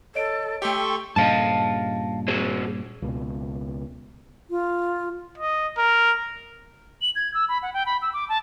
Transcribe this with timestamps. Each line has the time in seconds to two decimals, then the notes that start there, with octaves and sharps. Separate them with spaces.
0.15 A4 C#5 D#5 D7
0.62 A3 G4 A4 G5 C6 C#6
1.16 G2 A#2 C#3 D#5 F5 A5
2.28 F#4 G#4 C5
3.02 C#2 B2
4.50 F4
5.38 D#5
5.78 A#4
7.02 F#7
7.16 G#6
7.34 E6
7.49 B5
7.63 F#5
7.74 G5
7.86 B5
8.02 E6
8.13 D6
8.29 A5